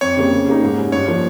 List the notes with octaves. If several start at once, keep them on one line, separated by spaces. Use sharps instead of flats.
F2 C#5
C#3 G3 A#3
C#3
G3 A#3 D#4
G#2
G3 C#4
G2 C#5
F3 A#3